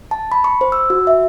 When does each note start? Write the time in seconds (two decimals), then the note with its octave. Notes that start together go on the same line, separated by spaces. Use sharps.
0.11 A5
0.32 B5
0.44 C#6
0.61 C5
0.72 E6
0.90 F#4
1.07 E5